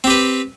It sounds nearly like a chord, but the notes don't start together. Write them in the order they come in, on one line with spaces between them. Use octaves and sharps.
C4 G4 B4